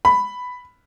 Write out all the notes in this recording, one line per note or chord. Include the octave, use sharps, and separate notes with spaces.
B5